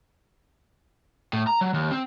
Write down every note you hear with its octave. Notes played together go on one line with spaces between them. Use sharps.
A2
A#5
F#3
D#2
C4